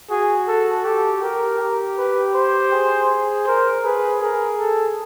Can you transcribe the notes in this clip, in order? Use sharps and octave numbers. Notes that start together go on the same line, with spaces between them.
F#4 G#4
A4
G4 A4
G4 A#4
G4
B4
C5
G#4
A#4 C5
G#4 B4
G#4 A#4
A4